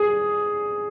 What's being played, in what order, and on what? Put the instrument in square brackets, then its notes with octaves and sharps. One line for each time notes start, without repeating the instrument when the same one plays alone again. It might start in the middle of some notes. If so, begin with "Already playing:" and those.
Already playing: [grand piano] G#4